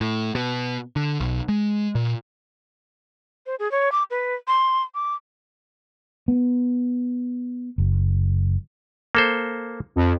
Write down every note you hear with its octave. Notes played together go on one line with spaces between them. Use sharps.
A2
B2
D3
B1
G#3
A#2
C5
G#4
C#5
D6
B4
C6
D6
B3
F#1
A#3 A4 C5
F2